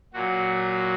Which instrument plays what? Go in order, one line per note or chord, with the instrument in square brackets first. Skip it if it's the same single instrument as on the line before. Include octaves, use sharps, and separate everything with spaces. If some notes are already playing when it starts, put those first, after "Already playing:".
[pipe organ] A#2 F#3 F#4